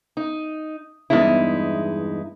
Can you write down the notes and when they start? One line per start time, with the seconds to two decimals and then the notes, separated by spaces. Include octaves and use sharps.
0.17 D#4
1.10 E2 G2 G#3 D#4 E4